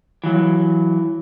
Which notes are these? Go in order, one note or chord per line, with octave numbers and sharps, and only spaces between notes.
E3 F#3